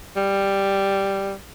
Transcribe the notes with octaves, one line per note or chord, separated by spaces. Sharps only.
G3